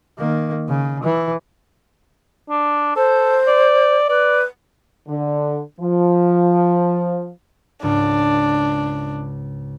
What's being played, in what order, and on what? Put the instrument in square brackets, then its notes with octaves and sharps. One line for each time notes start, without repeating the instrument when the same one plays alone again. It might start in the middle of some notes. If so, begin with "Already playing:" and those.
[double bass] D#3 A#3
C#3
E3
[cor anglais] D4
[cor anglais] A4 [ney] C5
[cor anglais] D5
[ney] B4 [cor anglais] D5
[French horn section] D3
F3
[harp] C#2 G#2 [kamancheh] D4